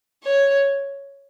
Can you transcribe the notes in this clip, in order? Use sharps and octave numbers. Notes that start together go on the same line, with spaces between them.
C#5